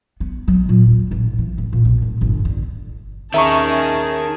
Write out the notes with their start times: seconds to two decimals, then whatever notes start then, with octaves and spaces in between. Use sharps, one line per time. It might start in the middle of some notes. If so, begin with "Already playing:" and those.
0.20 B3
0.48 F#3
0.69 A#2
0.87 D#2
1.11 A1
1.38 E3
1.58 D2
1.73 A#2
1.85 B1
2.02 A2
2.21 G1
2.45 D3
3.34 D#2 D#3 C#4 G#4 E5 A5 A#5 C#6